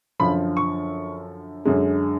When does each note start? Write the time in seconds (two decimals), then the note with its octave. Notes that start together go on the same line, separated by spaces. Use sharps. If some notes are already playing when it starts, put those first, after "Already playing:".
0.20 F#2 D3 F3 B5
0.57 C#6
1.65 F#2 D3 G#3